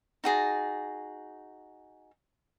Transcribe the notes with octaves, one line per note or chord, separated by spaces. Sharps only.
D#4 F#4 G#4 A5